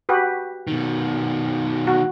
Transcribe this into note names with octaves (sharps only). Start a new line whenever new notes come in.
F#4 G4 B4
B2 D#3
F#4